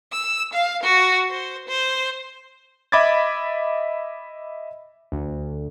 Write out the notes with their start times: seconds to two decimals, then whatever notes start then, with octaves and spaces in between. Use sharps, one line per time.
0.12 E6
0.53 F5
0.83 F#4
1.30 C5
1.68 C5
2.92 D#5 E5 B5 D6 G#6 A6
5.12 D2